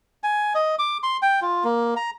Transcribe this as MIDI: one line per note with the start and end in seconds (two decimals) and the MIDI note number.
0.23 0.53 80
0.55 0.75 75
0.79 0.98 86
1.03 1.17 84
1.22 1.40 79
1.42 1.64 65
1.64 1.94 58
1.96 2.10 82